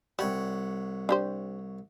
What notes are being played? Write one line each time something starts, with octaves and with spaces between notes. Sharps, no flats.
C2 G3 C#5 F#5
D4 G4 C5